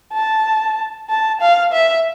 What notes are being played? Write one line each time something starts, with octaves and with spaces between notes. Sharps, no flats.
A5
A5
F5
E5